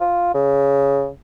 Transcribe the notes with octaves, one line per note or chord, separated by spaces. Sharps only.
F4
C#3